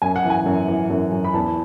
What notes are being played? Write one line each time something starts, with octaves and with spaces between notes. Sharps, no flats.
F#2 G#5
F#5
E3
G#5
F#2
E3
F#2
F#2
B5
E2 A5